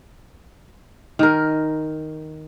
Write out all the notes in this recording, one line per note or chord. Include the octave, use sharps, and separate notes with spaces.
D#3 A#4